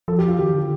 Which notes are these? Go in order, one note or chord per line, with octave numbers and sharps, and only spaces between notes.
F3 A4
G4
F4
D#3 G4
D3